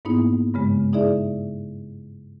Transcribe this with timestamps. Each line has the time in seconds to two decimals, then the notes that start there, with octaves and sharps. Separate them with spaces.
0.05 G#2 A#3 B3 D#4 E4
0.54 G2 C#3 G#3
0.93 D#4 E4 G#4 D5 E5